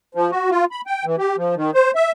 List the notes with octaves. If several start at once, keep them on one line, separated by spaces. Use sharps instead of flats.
F3
F#4
F4
B5
G5
E3
G4
F3
D#3
C5
E5